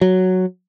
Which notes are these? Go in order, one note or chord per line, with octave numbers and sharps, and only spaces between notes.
F#3